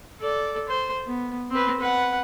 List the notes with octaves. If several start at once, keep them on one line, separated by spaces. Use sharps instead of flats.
A4 D5
C5
B3
C4 B4
B4 F#5